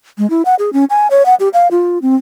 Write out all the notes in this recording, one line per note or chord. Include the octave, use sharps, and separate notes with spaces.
G#3
E4
F#5
G#4
C#4
G#5
C#5
F#5
G4
F5
F4
C4